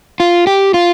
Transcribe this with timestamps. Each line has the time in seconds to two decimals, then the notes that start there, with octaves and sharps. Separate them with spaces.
0.20 F4
0.47 G4
0.74 F4